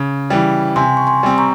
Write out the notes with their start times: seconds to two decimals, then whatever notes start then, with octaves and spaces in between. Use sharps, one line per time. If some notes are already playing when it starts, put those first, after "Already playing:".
Already playing: C#3
0.30 E3 G3
0.76 C3 G#5 C6
0.97 C#6
1.07 G#5 C6
1.23 G3 C4
1.38 A#5 C#6